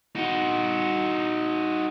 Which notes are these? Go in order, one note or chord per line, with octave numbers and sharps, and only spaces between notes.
D#4 F#4